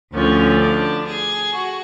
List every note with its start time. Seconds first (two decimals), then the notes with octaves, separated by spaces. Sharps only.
0.13 D2 D3 F3 C#4
0.61 D4
1.07 G#4
1.54 F#4